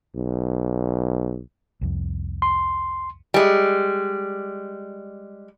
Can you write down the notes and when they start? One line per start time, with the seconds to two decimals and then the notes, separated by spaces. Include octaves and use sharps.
0.16 B1
1.81 C2 F2
2.42 C6
3.34 G3 G#3